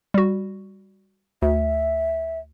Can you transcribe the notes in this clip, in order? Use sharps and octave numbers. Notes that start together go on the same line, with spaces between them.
G3 F#4
D2 E5